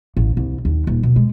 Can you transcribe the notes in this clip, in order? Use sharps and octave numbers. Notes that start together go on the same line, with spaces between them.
A1
C2
D#2
D#1
B2
G#3